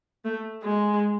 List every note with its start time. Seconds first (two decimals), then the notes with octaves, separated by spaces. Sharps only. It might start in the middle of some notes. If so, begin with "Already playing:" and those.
0.25 A3
0.64 G#3